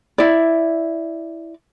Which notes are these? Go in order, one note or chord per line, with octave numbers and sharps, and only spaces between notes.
E4 D5